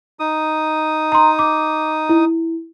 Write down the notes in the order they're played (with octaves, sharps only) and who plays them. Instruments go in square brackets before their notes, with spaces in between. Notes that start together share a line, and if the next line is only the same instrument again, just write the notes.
[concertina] D#4 D#6
[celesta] A#5 C6
D6
E4